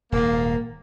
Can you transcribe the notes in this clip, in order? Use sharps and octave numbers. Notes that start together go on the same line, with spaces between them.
D#1 G#2 A#3